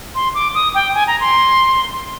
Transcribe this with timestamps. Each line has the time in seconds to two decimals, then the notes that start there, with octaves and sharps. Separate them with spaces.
0.15 C6
0.35 D6
0.55 D#6
0.75 G5
0.95 G#5
1.07 A#5
1.20 C6